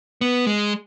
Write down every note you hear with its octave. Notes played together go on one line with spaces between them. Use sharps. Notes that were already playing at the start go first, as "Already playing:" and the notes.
B3
G#3